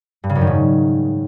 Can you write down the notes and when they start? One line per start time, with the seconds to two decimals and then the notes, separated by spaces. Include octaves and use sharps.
0.24 G2
0.29 C#3
0.35 F#2
0.41 D#3
0.47 G#2